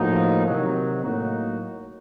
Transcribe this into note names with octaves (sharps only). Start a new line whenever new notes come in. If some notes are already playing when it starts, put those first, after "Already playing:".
Already playing: A2 F3 A#3 D#4 F#4
C3 D#3 F#3
A2 F#3 A#3 D#4 F#4